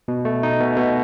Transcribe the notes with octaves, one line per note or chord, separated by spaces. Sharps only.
B2
A3
D#4
B2
B2